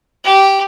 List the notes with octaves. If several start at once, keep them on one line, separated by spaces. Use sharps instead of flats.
G4